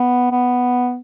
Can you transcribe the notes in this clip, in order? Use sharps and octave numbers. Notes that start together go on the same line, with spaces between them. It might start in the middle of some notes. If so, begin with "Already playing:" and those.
Already playing: B3
B3